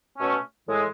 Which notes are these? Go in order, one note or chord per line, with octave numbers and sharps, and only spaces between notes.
B2 A3 C#4
A2 E3 G#3